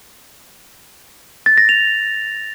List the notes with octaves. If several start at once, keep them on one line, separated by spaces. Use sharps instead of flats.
A6
A#6
F7